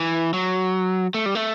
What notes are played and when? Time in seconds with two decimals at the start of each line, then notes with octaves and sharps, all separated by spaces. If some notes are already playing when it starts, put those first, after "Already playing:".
Already playing: E3
0.34 F#3
1.14 A3
1.26 G3
1.35 A3